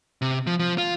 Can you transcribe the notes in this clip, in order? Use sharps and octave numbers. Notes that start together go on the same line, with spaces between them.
C3
F3
F3
F4